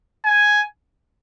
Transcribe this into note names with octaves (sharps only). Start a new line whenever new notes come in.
G#5